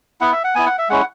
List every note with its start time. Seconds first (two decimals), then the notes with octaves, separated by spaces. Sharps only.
0.21 B3 E4 F#5
0.32 E5
0.44 F#5
0.55 B3 E4 G#5
0.66 F#5
0.78 E5
0.89 G#3 C#4 E4 F#5